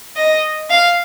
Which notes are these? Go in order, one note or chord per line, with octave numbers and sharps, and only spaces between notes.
D#5
F5